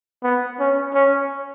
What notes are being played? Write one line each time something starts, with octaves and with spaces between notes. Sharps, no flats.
B3
C#4
C#4